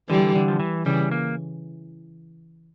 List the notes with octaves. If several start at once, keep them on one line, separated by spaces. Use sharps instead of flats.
D3 E3 G3
D3
F3
E3
C#3 E3 G3
A#3